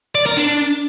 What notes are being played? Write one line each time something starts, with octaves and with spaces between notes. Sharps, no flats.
D5
A#4
D4